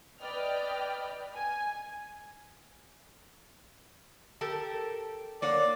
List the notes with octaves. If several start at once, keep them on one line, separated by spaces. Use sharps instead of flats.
B4 D5 D#5 G5 F6
G#5
G4 A4 A#4
A#3 C#5 D5 F#5